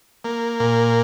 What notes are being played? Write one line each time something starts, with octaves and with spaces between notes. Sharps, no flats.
A#3
A#2